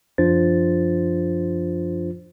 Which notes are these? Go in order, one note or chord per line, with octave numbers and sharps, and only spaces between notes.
F#2 F3 D4 F4 C5 A6